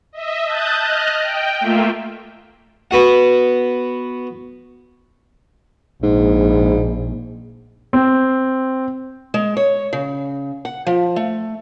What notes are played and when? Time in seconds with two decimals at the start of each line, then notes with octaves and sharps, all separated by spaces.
0.13 D#5 E5
0.47 A5 D#6 F#6 G6 A6
0.80 D#5 F6 F#6
1.20 G5
1.61 A3 A#3 F4 E5
2.91 B3 F#4 F#5
6.03 A#1 G#2
7.93 C4
9.34 G#3
9.57 C#5
9.93 C#3
10.65 F#5
10.87 F3
11.16 A3